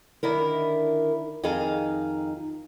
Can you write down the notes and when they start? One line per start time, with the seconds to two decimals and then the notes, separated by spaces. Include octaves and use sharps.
0.23 D3 D#3 E4 A#4
1.43 F2 D#3 D#4 G#4 F5 A#5